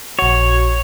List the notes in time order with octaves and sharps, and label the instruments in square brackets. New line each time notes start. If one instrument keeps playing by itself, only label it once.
[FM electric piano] A#1 F#4 [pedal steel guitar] C#5